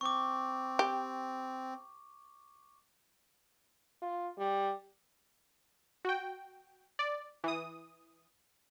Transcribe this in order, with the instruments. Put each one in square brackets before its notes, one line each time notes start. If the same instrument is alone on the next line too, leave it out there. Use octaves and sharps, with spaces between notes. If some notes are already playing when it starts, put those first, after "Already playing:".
[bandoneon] C4 [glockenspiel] C#6 D6
[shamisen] G4
[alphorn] F4
G3
[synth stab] F#4 G5
D5
E3 D#6